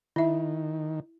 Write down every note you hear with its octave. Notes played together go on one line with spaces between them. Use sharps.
D#3 E4 E5